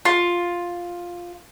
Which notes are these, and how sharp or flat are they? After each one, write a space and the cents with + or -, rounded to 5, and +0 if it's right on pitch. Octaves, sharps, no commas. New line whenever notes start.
F4 +5